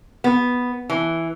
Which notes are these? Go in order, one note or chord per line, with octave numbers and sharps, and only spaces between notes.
B3
E3